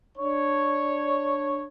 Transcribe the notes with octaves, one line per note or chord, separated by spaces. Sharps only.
D4 C#5